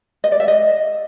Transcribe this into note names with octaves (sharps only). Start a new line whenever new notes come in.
D#5
D5
E5
D#5